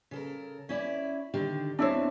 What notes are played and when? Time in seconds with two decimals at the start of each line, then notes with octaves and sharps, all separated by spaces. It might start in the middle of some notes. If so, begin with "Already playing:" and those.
0.11 C#3 A4 A#4
0.69 C#4 E4 D5
1.34 D3 D#3 G4
1.79 E2 C4 D4 E4 C#5